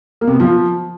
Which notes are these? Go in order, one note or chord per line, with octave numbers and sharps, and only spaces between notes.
A#3
C3
B3
F3